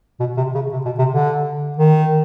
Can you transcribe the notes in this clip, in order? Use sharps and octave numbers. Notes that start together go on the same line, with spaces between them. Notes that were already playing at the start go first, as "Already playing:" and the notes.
B2
C3
C#3
C3
B2
C3
D3
D#3